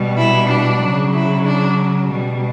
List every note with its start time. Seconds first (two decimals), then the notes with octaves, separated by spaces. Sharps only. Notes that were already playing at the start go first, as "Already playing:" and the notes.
Already playing: B2 G3
0.17 E4
0.50 D4
0.82 C#3 F#3
1.15 E4
1.47 D4
2.11 B2 G3